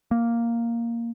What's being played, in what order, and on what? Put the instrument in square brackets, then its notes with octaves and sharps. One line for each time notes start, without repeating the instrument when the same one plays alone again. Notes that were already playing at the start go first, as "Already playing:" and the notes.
[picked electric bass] A#3